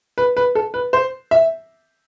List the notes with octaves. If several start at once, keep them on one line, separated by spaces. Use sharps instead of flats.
B4
B4
A4
B4
C5
E5